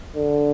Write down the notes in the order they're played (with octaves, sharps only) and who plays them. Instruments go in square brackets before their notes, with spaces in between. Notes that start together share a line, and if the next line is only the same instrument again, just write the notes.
[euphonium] D3